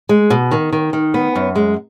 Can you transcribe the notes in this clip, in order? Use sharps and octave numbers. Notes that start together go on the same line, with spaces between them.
G#3
B2
D#3
D#3
D#3
B3
F#2
G#3